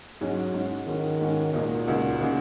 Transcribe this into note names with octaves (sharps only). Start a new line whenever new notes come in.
G#2 F#3 G#3 C#4 F#4
G#2 G#3 C#4 F#4
G#2 D#3 G#3 C#4 F#4
G#2 G#3 C#4 F#4
C#2 A#2 C#3 A#3 D#4 F#4
C#2 C#3 A#3 D#4 F#4
C#3 A#3 D#4 F#4